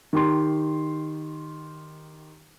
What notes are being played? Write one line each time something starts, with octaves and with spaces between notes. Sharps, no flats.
D#3 G4 C6